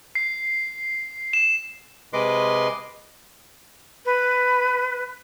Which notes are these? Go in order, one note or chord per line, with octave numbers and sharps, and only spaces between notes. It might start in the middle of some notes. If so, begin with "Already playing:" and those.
C7
E7
C3 G#3 B4 D#5 C6 D6
B4